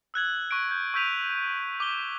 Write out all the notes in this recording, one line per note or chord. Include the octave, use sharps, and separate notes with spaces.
E6 F#6 G#6 F#7
C#6 F#6 D7
G6
C#6 E6 G6 B6 D#7 F7
D6 G7